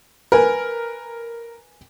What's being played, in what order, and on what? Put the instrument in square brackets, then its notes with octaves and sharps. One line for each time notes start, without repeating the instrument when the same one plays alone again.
[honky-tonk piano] A#4 [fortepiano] B4 G#5